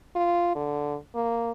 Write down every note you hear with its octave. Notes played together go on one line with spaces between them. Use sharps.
F4
D3
A#3